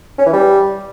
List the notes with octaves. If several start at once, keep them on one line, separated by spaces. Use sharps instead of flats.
C#4
E3
G3